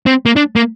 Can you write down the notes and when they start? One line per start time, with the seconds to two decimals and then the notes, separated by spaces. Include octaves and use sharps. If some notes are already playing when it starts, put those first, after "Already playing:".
0.06 C4
0.26 A#3
0.36 D4
0.56 A#3